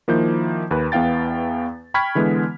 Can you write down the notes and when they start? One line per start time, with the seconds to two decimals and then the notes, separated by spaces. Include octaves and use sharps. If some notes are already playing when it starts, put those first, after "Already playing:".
0.08 D#3 F3 A#3 E4 G6
0.71 D#2 B4
0.92 E2 B3 E4 F5 G5 A6
1.94 G5 B5 C#6 F6 G#6 B6
2.15 D3 E3 G#3 B3